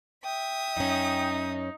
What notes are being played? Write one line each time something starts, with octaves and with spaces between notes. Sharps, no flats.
E5 G5 D#6
F#2 C#4 D#4